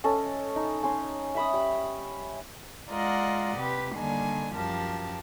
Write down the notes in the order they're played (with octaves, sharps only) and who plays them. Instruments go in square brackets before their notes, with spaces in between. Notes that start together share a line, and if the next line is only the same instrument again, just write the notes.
[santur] C#4 A4 D#5
D#4
C#4 G#5 C6
E5 B5 D#6
G3
[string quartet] G#3 F4 A#4 D5 D#5 F#5
C3 G4 B4
D3 D#3 G3 A#3 D4 G#5
F#2 F3 G4 A#4 A5